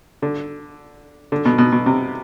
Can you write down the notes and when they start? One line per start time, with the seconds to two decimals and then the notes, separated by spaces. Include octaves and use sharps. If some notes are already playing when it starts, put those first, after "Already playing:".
0.22 D3
1.32 D3
1.45 B2
1.58 B2
1.72 B2
1.86 C3